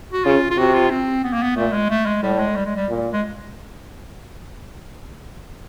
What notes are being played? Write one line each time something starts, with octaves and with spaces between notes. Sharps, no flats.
F#4
C#3 F4
F4
C3 F#4
F4
C4
B3
A#3
B3
A#2 A3
G#3
A3
G#3
A2 G3
G#3
G3
G#3
G3
A#2
G#3